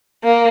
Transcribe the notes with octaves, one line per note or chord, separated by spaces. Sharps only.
A#3